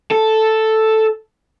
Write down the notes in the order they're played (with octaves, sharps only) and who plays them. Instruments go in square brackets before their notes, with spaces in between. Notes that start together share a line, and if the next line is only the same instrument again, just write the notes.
[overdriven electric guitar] A4